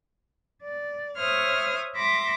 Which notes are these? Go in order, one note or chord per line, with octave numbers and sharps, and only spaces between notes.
D5
C5 C#5 E5 D#6 F6
E5 B5 C6 D6 A#6